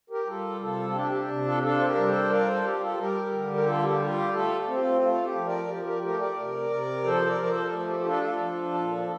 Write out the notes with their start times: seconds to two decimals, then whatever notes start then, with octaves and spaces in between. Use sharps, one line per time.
0.10 G4 A#4
0.27 G3 F4 A4
0.61 C3 F4 A4
0.90 F4
0.95 D4 G4
1.11 G4
1.29 C3
1.46 F4 A4
1.57 G4
1.62 D4 F4 A4
1.81 C5
1.85 G4 A#4
1.96 G3
2.08 A4 C5
2.30 F4 A#4 D5
2.47 A4 C5
2.64 G3 G4
2.81 F4 A4
2.97 G3 G4 A#4
3.32 D3
3.53 A#4
3.66 G3 F4 A4
3.83 G4
4.00 F4
4.16 G4
4.33 A3 F4 A4
4.67 C4
4.75 G4
4.78 F4
5.01 A3 F4
5.23 G4
5.35 F3
5.46 A#4 D5
5.69 F3 G4
5.85 G4 A#4
6.02 A3 G4 A#4
6.20 A#4 D5
6.36 C3
6.70 C3
7.04 F3 A4 C5
7.26 A#4 D5
7.38 F3
7.44 D5
7.49 A4 C5
7.72 A3
7.89 G4
7.99 G4
8.06 D4 F4 A4
8.22 F4 A4
8.39 F3
8.74 A#2
8.97 F4